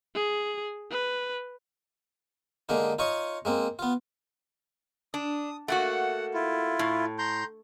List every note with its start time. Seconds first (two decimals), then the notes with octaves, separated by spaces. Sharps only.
0.15 G#4
0.91 B4
2.69 D3 G#3 A#3 D#4
2.99 D#4 F4 C#5 D#5 C#6
3.45 G#3 A#3 C4
3.79 B3 F4
5.14 D4 D#6
5.68 A3 A#3 F#4 F#5
6.34 E4 F4
6.79 A2
7.19 A#5 C6 G6